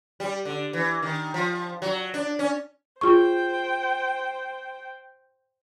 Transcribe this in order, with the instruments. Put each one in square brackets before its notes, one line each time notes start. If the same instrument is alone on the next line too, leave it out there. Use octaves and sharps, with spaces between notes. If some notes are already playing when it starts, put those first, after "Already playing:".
[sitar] G3
D3
E3
D#3
F3
F#3
D4
C#4
[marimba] F4 G#4 C#6 [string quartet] C5 G5